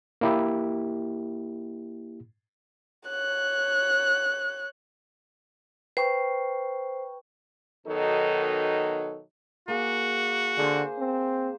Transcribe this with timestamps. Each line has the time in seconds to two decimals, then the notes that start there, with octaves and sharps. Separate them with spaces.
0.21 A#3 E4 G4
3.09 C#5 F#6
5.97 B4 C5 G5 C#6
7.87 B2 D#3 F#3 D#4 A4
9.68 A#3 F#4 G#4
10.58 D3 G#4 C5
10.98 C4